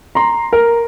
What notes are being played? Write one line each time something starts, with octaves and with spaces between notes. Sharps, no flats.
A#5 C6
A#4